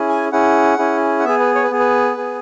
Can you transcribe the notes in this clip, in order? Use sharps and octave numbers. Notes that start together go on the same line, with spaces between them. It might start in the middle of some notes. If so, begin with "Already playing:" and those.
Already playing: C#4 E4 G#4
G#5
C#4 E4 G#4 F#5
C#4 E4 G#4
F#5
B3 G#4 E5
B4
C#5
B4
B3 G#4
B4
B3 G#4